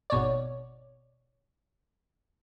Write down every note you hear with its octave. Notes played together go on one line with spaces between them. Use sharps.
G#1 B2 C#5 D5